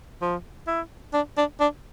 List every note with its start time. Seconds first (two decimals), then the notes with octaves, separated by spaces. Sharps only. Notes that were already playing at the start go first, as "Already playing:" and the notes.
0.22 F3
0.67 E4
1.14 D4
1.37 D4
1.60 D4